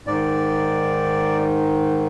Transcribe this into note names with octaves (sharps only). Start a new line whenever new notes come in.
G#2 D#3 D5